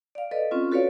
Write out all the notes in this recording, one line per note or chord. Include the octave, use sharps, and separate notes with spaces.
D5 F5
A4 B4 D5 D#5
C4 C#4 F4
F#4 A4 B4 C#5 D5 F5